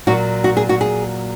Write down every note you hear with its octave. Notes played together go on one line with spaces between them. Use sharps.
A#2 F#3 F#4
F#4
G#4
F#4
G#4